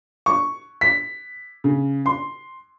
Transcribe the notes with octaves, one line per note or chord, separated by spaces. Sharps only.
C#6
B6
C#3
C6